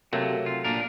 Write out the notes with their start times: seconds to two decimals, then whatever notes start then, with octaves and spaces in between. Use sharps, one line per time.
0.13 C3 F#3 A3 A#3
0.46 F4
0.65 A#2 D4 A#4